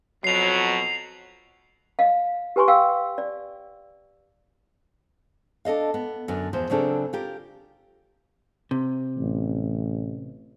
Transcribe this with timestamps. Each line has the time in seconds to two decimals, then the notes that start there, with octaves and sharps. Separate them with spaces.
0.24 F2 B2 F#3 C7 F7
1.99 D#5 F5
2.56 G4 B4 G#5 C6 C#6
2.68 F5 G5 E6
3.18 D5
5.65 D4 A4 D#5 F5
5.94 B3
6.28 F#2 D3 B3 D4
6.53 E2 F3 C5
6.70 C#3 F#3 C4 D4 G#4 A4
7.13 F4 G4 A#4
8.71 C3
9.18 A1